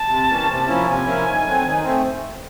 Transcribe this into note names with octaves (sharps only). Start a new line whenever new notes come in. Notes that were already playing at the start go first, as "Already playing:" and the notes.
Already playing: A5
C3
E3 G3 A#3 C#4
C3
F3 A#3 C#4 E4
C3 G#5
F3 A#3 C#4 E4
D#3
F#3 A3 C4
D#3
A3 C4